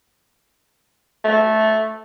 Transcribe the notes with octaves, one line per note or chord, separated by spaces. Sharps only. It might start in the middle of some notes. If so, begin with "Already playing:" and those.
A3